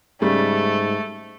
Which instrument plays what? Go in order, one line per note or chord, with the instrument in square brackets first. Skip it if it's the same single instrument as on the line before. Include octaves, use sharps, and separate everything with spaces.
[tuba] G#2 [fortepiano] C#3 G3 [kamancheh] A3